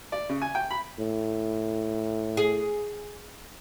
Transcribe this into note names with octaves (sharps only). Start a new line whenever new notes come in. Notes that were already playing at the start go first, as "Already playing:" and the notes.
D5
C#3
G#5
G5
B5
A2
G#4